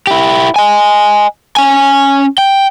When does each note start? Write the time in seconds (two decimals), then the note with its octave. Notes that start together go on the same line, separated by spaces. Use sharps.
0.07 E4 G4
0.56 D#5 G#5
1.57 C#4 G#5
2.38 G5